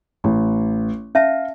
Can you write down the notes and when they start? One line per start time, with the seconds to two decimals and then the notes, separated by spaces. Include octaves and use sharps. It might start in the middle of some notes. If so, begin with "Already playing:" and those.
0.24 A1
1.15 C#4 E5 F5 A5